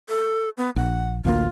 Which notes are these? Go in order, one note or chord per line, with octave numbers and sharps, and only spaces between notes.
A4
B3
A#1 F#5
A1 D2 A#3 F4